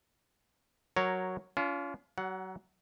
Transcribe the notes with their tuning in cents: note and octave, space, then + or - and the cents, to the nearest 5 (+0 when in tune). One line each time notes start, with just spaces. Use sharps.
F#3 +0 A#4 +0 C#5 +0
C#4 +40 F4 -10
F#3 +30 F#5 +0